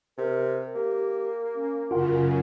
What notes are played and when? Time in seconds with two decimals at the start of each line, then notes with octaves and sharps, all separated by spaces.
0.18 C3 A#4
0.75 A#3 G4
1.55 C#4
1.91 F#2 C#3 F4 A#4 F#5